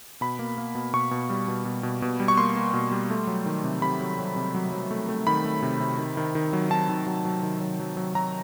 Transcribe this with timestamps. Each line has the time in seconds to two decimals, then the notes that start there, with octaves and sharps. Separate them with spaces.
0.21 B2 B5
0.39 A#3
0.58 A#3
0.75 B2
0.93 B2 C#6
1.11 B2
1.30 G3
1.48 B2
1.65 B2
1.83 B2
2.02 B2
2.20 G3
2.28 C#6
2.37 A#3 C6
2.56 A#3
2.73 B2
2.92 G3
3.10 A3
3.27 F#3
3.46 D#3
3.64 C3
3.82 C3 B5
4.01 F#3
4.19 F#3
4.36 C3
4.54 F#3
4.72 F#3
4.91 A3
5.09 A3
5.27 D#3 B5
5.44 A3
5.63 C3
5.80 C3
5.98 D#3
6.17 D#3
6.35 D#3
6.53 F#3
6.70 D#3 A5
6.89 D#3
7.07 F#3
7.25 F#3
7.43 D#3
7.60 F#3
7.79 F#3
7.97 F#3
8.15 F#3 A#5